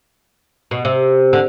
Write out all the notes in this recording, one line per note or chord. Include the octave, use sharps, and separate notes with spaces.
B2
C3
D3